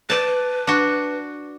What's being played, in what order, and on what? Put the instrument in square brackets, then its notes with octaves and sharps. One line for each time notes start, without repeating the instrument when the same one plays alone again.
[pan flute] B4 [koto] D5 A5
[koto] D4 F#4